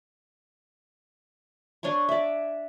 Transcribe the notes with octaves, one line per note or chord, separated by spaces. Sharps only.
D4 C#5 G#5 C#6
D5 E5